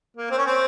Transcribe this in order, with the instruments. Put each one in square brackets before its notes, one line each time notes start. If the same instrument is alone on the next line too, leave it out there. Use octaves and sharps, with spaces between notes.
[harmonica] A#3
C4
C#4
C4